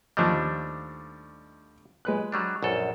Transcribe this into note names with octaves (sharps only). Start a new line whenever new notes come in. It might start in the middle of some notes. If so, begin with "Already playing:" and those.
D#2 F3 G3 A3 D4 D#5
G#3 B4 F#6
F#3 G3 D4
A#1 F#2 A4